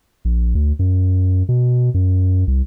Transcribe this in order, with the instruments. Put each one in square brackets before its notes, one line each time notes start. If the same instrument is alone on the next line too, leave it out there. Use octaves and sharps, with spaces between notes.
[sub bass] A#1
D2
F#2
B2
F#2
C2